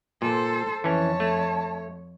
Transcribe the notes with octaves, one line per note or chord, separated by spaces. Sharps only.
A#2 A4 C5
F2 E3 C#4 C#5 A5
A3